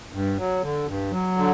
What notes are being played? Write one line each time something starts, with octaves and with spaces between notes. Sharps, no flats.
G2
F#3
D3
G2
F#3
D3